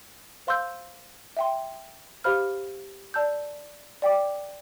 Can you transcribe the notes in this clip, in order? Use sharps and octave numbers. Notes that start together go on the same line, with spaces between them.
C5 F5 C6 E6 G6
E5 G5 C6
G4 C5 F5 B5 F6
D5 A5 E6 G6
D5 G5 D6